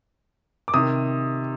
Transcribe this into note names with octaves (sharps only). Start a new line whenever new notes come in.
D6
C3 D#3 D#6